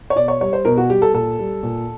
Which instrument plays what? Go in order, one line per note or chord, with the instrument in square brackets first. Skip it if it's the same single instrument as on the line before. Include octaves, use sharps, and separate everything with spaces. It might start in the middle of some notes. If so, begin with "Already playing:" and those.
[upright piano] C#5
B2 D5
C#5
G3 C#5
C5
B2 A#4
F#4
G3 G4
A4
A#2 A4
G3
A#2